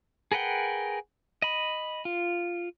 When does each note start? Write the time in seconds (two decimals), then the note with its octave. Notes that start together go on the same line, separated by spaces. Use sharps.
0.32 G#4 A#4 B4 F#5 G5
1.42 D#5 B5
2.05 F4